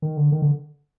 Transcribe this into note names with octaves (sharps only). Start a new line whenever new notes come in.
D#3
D3
D#3
D3